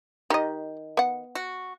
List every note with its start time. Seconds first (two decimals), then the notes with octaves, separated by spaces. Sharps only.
0.30 D#3 G4 D#5
0.97 B3 F#5
1.35 F#4